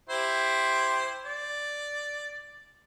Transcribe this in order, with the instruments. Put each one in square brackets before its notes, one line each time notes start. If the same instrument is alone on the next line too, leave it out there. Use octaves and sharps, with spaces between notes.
[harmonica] E4 G4 C5
D5